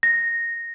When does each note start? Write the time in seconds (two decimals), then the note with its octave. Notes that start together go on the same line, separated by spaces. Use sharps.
0.03 A#6